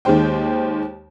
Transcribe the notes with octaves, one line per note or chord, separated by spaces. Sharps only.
D#2 D#3 G#3 C5 G5